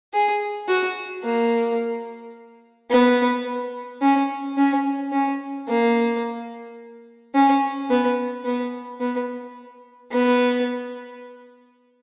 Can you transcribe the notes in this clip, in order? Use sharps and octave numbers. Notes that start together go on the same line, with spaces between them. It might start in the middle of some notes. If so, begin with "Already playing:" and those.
G#4
F#4
A#3
B3
C#4
C#4
C#4
A#3
C#4
B3
B3
B3
B3